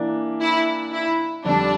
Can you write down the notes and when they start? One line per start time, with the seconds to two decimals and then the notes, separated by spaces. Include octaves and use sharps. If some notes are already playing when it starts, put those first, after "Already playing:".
Already playing: E3 A#3 D4
0.41 E4
0.92 E4
1.44 F2 D3 G3 D4